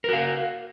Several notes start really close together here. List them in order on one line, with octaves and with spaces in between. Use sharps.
A#4 F#4 F5